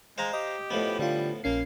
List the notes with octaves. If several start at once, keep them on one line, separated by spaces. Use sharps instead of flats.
G#3 C5 F5 A#5
G4 D#5
A2 F3 B3
D3 G3 F4
A#1 A#3 C#4 C7